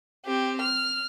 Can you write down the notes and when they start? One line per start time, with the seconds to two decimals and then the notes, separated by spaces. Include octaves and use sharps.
0.26 C4 G4
0.62 F6